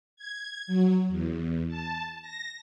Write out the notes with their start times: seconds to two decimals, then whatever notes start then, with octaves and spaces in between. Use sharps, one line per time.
0.16 G#6
0.67 F#3
1.09 E2
1.68 A5
2.22 A#6